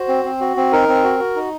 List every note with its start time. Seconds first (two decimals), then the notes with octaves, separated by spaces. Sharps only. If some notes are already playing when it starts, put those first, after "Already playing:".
Already playing: F#4 C5
0.08 C4
0.25 C4
0.40 F#4
0.57 C4
0.72 D#4 A#4
0.88 C4
1.03 F#4
1.19 F#4
1.36 D#4